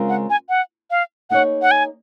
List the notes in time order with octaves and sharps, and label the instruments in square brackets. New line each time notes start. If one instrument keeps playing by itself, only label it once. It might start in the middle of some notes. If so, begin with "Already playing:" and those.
Already playing: [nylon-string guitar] C#3 G#3 C4 F4 A#4
[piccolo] F#5
G#5
F#5
F5
[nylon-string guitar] A#3 D#4 G#4 C#5 [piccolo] F#5
[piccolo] F#5
G#5